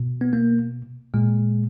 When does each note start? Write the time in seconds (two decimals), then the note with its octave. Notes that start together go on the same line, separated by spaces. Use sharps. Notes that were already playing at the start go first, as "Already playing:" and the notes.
Already playing: B2
0.21 B3
0.33 A#3
1.14 A#2 G#3